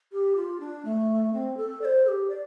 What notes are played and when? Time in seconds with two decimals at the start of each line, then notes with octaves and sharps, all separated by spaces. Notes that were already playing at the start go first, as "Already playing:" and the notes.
0.12 G4
0.36 F4
0.60 D4
0.85 A3
1.33 C4
1.57 A4
1.81 D5
1.85 C5
2.05 A4
2.08 G4
2.29 D5